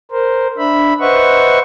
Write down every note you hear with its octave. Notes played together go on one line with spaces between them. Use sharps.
A#4 C5
D4 E5 B5
B4 C5 D#5 E5 F#5 C#6